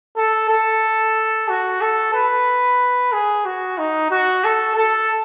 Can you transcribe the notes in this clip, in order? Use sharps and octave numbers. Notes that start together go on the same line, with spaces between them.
A4
A4
F#4
A4
B4
G#4
F#4
D#4
F#4
A4
A4